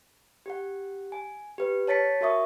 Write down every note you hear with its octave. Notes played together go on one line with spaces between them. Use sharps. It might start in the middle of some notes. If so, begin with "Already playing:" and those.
G4 F#5
G#5
G4 B4
C#5 A5 A6 B6 C#7
F#4 A#4 E5 C#6 D#6